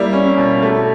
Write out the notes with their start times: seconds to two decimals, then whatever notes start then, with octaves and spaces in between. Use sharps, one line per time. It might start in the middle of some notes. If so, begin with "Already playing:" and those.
Already playing: G3 A#3 E4
0.13 C#4
0.38 B2
0.63 A3